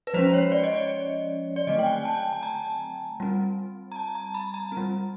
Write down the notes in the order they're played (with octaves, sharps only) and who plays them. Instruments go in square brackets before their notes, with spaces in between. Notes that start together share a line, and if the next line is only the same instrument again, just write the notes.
[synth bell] B4
F3 G#3 C#4 C5
C#5
D5
D#5
D5
D5
D3 F#3 A3 C4 D#5
G5
G#5
A5
A5
A#5
G3 C4
A#5
A5
A#5
B5
A#5
C4
G3